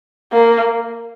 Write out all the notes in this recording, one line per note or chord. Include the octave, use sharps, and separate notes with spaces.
A#3